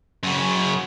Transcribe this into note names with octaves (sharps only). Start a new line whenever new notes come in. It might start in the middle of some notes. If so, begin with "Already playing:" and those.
F#2 C#3